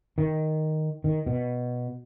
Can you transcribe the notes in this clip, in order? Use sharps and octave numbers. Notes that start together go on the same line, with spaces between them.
D#3
D#3
B2